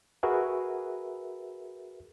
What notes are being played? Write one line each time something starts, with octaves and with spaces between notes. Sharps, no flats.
F#4 G#4 A#4 B4 E5